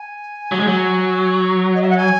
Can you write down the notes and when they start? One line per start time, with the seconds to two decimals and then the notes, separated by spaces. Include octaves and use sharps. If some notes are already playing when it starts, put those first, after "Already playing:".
Already playing: G#5
0.52 F#3
0.60 G#3
0.67 F#3
1.75 D#5
1.82 E5
1.89 F#5
1.97 G#5